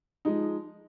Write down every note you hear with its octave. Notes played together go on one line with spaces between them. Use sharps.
F3 G#3 D#4